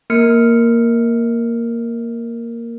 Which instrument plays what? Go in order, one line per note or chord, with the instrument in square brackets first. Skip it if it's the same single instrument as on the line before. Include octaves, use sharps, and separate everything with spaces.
[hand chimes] A#3 A#4 F6 C#7